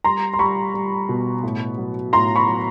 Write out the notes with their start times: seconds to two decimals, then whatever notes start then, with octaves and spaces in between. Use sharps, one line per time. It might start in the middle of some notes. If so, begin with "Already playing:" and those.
0.04 G3 A#5 C6
0.34 C6
0.39 G3 B5 C#6
0.74 G3
1.09 B2
1.43 A2
1.78 F#3
2.13 A2 A#5 C6
2.36 B5 C#6
2.47 F#3